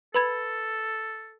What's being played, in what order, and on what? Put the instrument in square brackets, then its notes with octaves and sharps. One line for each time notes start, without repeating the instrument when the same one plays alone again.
[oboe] A4 [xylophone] B4 B5 G#6